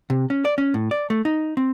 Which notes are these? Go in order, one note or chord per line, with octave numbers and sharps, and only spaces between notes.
C3
C#4
D5
C#4
A2
D5
A3
D#4
C4